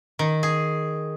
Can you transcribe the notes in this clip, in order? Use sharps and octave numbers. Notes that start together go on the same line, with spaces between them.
D#3
G#4